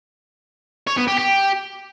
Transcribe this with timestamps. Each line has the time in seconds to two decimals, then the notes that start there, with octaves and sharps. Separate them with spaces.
0.87 C#5
0.97 B3
1.08 G4
1.18 G4